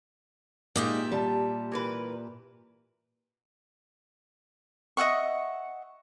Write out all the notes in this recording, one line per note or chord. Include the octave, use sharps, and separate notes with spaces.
A#2 G#3 A#3 D#4 G4 E5
G3 A5
E3 A#4 B4
D#5 E5 F#5 C#6